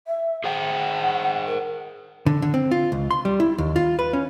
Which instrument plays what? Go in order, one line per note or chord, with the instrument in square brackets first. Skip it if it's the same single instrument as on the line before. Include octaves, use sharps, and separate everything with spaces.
[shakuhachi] E5
[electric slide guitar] G#4 C5 G5 [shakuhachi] F#5
[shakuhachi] A#4
[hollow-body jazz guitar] D3
D3
C4
F4
C#2
C6
G3
E4
D#2
F4
B4
C#4